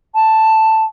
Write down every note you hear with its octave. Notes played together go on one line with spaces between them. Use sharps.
A5